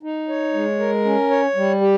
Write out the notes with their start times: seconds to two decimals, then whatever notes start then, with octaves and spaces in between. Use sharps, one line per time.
0.03 D#4
0.29 C#5
0.54 G#3
0.79 A#4
1.05 C#4
1.30 C#5
1.56 G3
1.81 G4